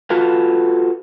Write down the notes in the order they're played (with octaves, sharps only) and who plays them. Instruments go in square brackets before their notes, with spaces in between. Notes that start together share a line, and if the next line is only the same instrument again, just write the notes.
[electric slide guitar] F4 F#4 A4 B4 F5